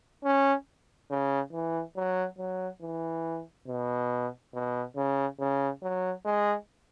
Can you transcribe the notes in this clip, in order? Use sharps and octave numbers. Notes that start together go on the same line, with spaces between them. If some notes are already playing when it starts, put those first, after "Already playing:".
C#4
C#3
E3
F#3
F#3
E3
B2
B2
C#3
C#3
F#3
G#3